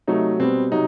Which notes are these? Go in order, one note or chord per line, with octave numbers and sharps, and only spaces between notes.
C3 F#3 A3 D#4
B2 G3 B3 C4
C3 F#3 D#4